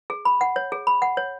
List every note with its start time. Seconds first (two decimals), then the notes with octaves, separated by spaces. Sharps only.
0.10 G#4
0.25 B5
0.41 F#5
0.56 C#5
0.72 G#4
0.87 B5
1.02 F#5
1.17 C#5